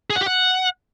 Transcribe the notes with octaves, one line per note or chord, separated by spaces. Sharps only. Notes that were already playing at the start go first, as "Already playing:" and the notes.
G#4
F#5
G4
F#5